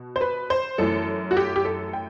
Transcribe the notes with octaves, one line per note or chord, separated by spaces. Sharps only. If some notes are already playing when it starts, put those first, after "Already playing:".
Already playing: B2
C5
B4
C5
F#2 E3 A3 A4
F#4
G4
G4
A4
G5